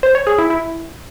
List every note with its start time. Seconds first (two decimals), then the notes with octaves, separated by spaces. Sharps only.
0.03 C5
0.15 C#5
0.27 G#4
0.38 E4
0.50 E4